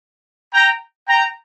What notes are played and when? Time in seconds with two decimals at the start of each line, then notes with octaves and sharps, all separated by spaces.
0.54 G5 A#5
1.08 G5 A#5